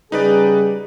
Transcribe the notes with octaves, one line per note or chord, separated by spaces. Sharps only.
C#3 G3 D#4 G#4 B4 D5